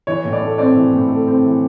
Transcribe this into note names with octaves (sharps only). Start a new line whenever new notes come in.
E3 C#5
A2
D5
A3
C4 D5
E3
A2
A3
C4
E3